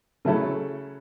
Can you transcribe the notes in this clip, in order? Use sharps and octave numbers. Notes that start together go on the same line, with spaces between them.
C#3 F#3 A3 E4 A4